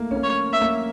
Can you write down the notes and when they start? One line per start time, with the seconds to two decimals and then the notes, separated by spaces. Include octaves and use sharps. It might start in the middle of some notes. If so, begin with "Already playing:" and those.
Already playing: A3 A#3
0.11 C#4
0.16 A#3
0.24 C#5
0.53 E5
0.61 A#3